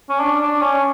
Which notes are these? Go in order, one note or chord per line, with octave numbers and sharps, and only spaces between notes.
C#4
D4
D4
C#4